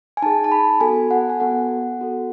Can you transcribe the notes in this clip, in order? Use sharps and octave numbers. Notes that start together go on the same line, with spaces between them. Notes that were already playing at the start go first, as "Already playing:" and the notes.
G#5
D#4 G#4 A5
A5
B5
B3 F#4 A4 G#5
F#5
G#5
B3 F#4 A4 F#5
B3 F#4 A4